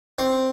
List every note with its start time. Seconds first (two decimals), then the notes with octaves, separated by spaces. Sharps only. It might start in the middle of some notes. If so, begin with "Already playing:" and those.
0.19 C4